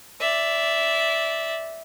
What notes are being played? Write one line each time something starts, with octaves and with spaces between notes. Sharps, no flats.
D5 E5